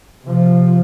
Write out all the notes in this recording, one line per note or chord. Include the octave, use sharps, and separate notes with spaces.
C3 F3